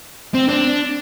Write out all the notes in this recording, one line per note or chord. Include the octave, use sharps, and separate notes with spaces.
C4
D4